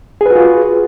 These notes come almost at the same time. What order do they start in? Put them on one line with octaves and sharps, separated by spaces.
G#4 B4 F#4 F4